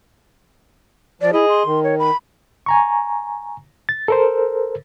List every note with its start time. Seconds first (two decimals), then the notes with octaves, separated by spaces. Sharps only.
1.21 F3 D5
1.33 E4 G#4 D#5
1.48 C6
1.66 D#3
1.84 C#5
1.99 B5
2.66 G#5 A#5 C#6
3.89 A6
4.08 A4 A#4 C5